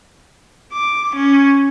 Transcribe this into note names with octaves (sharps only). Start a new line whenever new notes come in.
D6
C#4